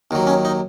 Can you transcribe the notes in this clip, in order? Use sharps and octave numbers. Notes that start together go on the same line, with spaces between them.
D#2 D#3 F#3
C#4
D#4